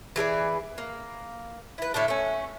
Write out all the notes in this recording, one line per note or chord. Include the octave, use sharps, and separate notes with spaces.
E3 G#4 A4 D5
A#3
E4 B4
A2 D3 A3 D4
A3 C#4